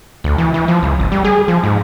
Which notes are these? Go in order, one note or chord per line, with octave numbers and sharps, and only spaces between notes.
D2
E3
E3
F3
C#2
G#1
G3
G#4
F3
G#2